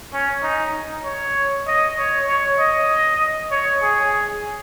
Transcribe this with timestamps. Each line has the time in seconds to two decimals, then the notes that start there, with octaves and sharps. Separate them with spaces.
0.14 C#4
0.43 D#4
1.05 C#5
1.68 D#5
1.98 C#5
2.28 C#5
2.59 D#5
3.51 C#5
3.83 G#4